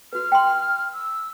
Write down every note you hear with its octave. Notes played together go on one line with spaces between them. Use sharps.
F#4 B4 F6
G5 C6
E6